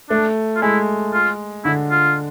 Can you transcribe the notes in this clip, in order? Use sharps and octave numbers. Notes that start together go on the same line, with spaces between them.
A3 D4
F4
G#3 E4
F4
D3 E4
F4